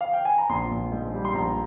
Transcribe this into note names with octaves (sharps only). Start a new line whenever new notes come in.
F5
G5
G#5
A#5
A#1 C6
A#1
G#2
G3
C6
A#1 A#5